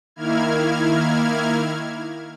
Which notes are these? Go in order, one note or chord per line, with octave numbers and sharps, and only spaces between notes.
D#3 A#3 E4 F6 G#6